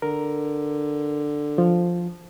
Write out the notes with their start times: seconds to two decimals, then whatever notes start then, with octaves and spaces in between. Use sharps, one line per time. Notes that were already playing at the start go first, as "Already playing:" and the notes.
0.02 D3 A#4
1.58 F3